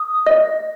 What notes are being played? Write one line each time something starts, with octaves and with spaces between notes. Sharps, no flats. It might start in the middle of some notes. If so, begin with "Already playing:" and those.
Already playing: D#6
D#5